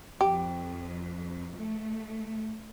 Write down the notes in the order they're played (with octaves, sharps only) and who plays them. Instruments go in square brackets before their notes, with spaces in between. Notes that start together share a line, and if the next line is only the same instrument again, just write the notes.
[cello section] F2 [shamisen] G4
[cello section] A3